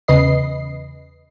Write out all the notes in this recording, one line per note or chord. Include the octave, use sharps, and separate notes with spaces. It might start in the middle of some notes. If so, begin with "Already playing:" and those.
E2 C#3 B4 D#5 C7